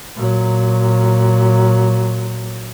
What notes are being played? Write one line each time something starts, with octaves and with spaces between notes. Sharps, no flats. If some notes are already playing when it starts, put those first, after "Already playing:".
A#2 F#3